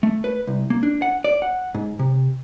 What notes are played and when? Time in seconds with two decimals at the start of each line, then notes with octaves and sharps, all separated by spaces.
0.03 A3
0.24 B4
0.47 C2
0.70 A#3
0.83 D4
1.02 F#5
1.24 D5
1.42 F#5
1.74 G#2
1.99 C3